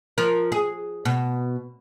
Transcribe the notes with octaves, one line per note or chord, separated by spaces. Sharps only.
F3 A#4
G#4
B2